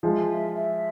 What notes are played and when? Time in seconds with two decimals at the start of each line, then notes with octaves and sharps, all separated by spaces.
0.03 F3 G#3 E5
0.28 E5
0.54 E5